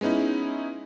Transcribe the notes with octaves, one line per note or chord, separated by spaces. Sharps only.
G#3 B3 C#4 D#4 E4